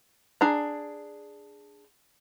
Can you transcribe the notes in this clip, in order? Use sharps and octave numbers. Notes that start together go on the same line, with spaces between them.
D4 G#4 A#5